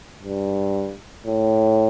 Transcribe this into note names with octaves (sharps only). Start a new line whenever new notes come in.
G2
A2